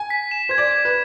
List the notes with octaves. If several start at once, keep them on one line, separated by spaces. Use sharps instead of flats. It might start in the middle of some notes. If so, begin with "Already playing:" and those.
Already playing: G#5
B6
E7
C5 G#6
D5
G#6
B4